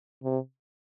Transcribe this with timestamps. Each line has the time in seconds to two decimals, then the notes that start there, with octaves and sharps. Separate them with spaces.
0.23 C3